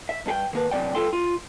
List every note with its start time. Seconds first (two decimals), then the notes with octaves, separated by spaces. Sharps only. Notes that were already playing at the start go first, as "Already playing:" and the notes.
0.09 E5
0.26 G2 G#4 G5
0.53 D#3 A#3 B4
0.71 F#2 C3 F#3 D5 G5
0.95 G2 F4 A4 E5 G5 C6
1.13 F4